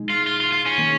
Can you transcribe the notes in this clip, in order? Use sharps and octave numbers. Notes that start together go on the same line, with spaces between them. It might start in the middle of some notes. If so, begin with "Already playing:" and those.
Already playing: B2 G#3 D#4 G#4
F4
F4
F4
F4
C#4
D#3 A#3 D#4 G#4